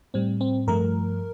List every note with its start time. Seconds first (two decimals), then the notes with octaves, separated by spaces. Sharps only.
0.14 A2 G3 C4
0.41 C4
0.67 G2 F3 A3 A#4